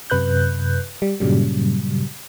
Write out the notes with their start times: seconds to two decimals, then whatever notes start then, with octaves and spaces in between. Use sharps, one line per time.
0.10 F#2 C3 B4 F#6 G6
1.02 G3
1.20 G2 A#2 C#3 F#3 G3